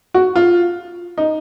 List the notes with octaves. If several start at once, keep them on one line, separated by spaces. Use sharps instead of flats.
F#4
F4
D#4